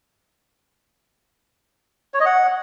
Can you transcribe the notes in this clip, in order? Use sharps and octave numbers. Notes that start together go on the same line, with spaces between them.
C#5
D#5
F#5